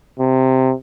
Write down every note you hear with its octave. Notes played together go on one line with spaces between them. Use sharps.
C3